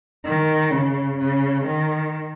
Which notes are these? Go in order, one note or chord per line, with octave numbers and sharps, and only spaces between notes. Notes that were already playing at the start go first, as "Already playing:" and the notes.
D#3
C#3
C#3
D#3